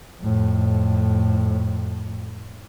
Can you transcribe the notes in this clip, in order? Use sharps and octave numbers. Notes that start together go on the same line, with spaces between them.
F2 A2